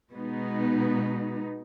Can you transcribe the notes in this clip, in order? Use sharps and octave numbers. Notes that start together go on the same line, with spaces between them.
B2 G#3 B3 D#4